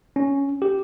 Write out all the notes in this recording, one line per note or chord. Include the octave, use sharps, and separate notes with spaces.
C#4
G4